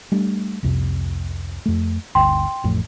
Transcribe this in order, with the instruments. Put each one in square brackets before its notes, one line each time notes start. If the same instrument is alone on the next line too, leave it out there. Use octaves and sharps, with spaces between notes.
[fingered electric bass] G3 A3 D4
C2 F2 C3
F2 A3
[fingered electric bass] G1 D2 [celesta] G5 C6
[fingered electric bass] A1 F2 A2